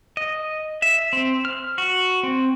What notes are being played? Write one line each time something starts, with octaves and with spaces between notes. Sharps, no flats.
D#5
E5
C4
F6
F#4
C4